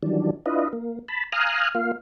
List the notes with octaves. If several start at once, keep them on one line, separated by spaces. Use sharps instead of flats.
D#3 E3 F#3 G3 D4
D4 E4 F4 B4 D#5
A#3
A5 B5
F5 G#5 A#5 D#6 F6 F#6
A#3 F4 F5